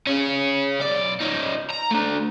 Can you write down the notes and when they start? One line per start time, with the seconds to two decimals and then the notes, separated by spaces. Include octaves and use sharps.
0.07 C#4 G#4
0.82 B1 D5
1.21 C#4 D#4
1.71 A#5
1.91 A3 D4